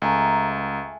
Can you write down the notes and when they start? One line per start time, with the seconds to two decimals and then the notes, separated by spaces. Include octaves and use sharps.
0.02 C#2 A3 G#5 A#5